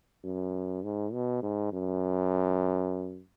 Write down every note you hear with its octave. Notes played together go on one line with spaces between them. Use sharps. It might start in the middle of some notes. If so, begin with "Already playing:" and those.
F#2
G#2
B2
G#2
F#2